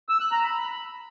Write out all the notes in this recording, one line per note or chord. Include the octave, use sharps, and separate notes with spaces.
E6
F#6
A#5
B5